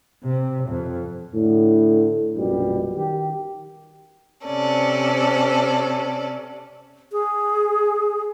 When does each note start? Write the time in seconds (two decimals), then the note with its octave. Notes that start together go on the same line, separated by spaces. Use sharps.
0.24 C3
0.69 F2
1.35 A2 D3
2.36 A#1 F#2 B2 G3
2.95 D#3 G4
4.44 C3 C#4 A4 D5
7.12 G#4